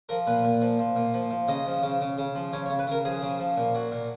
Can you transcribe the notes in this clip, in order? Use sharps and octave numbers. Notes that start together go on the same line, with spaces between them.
F3 A#4
A#2 B4
A#2
F3
F3
A#2
F3
F3
C#3 D#5
F3
C#3
C#3
C#3
F3
C#3 C#5
C#5
C#3
B4
C#3 A#4
F3 G#4
C#3
F3
A#2
F#3
A#2